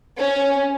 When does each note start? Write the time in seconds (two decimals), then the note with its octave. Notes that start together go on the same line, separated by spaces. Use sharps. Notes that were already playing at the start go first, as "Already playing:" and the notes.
0.19 C#4